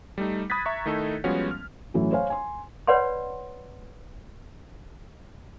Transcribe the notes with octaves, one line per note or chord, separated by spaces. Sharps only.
G3 A3 D#4
B5 D#6 F#6 G#6 A6 B6
E5 A#5 C#6
D#3 A3 D#4 E4 A4
F3 G3 G#3 B3 C#4 F#4
F6
A2 E3 F#3 A3 C#4 F#4
C5 C#5 F5 G#5
G#5 C6
B4 C#5 D5 F#5 B5 C6